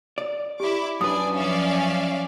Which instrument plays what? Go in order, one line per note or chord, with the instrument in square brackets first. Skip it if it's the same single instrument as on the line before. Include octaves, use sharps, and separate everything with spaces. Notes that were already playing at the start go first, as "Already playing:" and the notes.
[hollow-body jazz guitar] D5
[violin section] E4 D6 [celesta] G4
[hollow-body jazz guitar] F#2 B4 [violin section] D4 D5 G#5 [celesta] D#6
[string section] F3 C#4 [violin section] D5 E5 F5